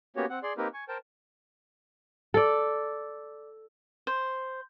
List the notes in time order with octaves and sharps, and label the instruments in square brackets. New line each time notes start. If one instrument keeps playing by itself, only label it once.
[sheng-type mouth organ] A#3 B3 C#4 F#4 G4 C#5
C4 F#5
G#4 D5 C6
A#3 C4 D#4 G4 A#4 B4
G#5 C#6
A#4 C5 G5 A5
[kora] A4 D5
[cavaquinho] C5